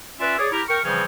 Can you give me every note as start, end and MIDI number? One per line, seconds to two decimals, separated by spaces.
0.20 0.36 61
0.20 0.36 65
0.20 0.36 71
0.20 0.36 74
0.20 0.36 76
0.39 0.49 68
0.39 0.49 73
0.39 0.49 74
0.52 0.62 64
0.52 0.62 67
0.52 0.62 70
0.69 0.80 70
0.69 0.80 79
0.69 0.80 85
0.85 1.05 49
0.85 1.05 52
0.85 1.05 53
0.85 1.05 55
0.85 1.05 60
0.85 1.05 61